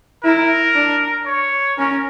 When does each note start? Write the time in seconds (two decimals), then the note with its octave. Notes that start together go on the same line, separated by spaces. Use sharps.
0.24 E4 A#4
0.75 D4
1.26 C#5
1.78 C#4 A#4